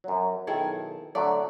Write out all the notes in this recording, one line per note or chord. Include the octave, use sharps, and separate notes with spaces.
F#2 F#3
B1 D#3 E4 G#4 A4
D3 F#3 A3 D5